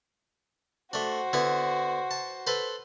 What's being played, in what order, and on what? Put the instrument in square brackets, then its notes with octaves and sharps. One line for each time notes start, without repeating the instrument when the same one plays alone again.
[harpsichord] A3 D4 [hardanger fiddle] F#4 C5
[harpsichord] D3 B3 E4
A5
A4 B4 C5